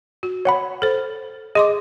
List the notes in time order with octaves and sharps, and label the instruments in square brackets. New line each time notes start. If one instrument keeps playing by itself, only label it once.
[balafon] F#4
[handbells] C#5 F#5 B5
[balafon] A4 C5
[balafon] G#4 C6 D6 [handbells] D#5